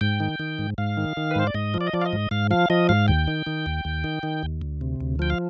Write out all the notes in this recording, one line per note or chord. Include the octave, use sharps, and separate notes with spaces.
G#2 G5
D#3
D#3
G#2
G#2 F5
D#3
D#3
B4
G#2 C5
D5
G#2 D#5
F3
D5
D#5
F3 D5
F5
D#5
G#2
G#2 F5
F3 F5
F3 D#5
G#2 F5
D#2 G5
D#3
D#3
D#2
D#2
D#3
D#3
D#2
D2
C3
D2
F3 G5
F5